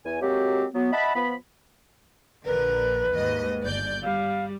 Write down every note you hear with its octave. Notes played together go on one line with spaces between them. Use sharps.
E2 G#5
F#3 G#3 A#3 C4 F#4 G4
F#3 B3
D#5 E5 F#5 A5 B5
F3 B3 B5
A#1 D3 A#4 B4
D#2 G#2 D#5
G1 D5 G6
G3 F5